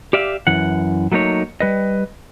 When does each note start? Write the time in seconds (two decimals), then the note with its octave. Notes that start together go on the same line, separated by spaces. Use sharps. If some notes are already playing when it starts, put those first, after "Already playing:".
0.13 G4 D5 E5 F5
0.47 F#2 E3 F#5
1.12 F#3 A3 A#3 D#4 C#5
1.60 G3 B4 D#5